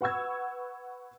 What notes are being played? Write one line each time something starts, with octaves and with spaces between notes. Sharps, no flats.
B4 F#5 C#6 E6 G#6